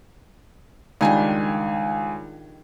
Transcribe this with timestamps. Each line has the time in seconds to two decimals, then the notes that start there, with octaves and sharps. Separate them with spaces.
1.01 C#2 D#3 G3 D4 G#5